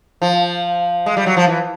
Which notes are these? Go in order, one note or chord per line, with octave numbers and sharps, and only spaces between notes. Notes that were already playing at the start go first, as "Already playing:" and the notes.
F3
G#3
G3
F#3
F3
E3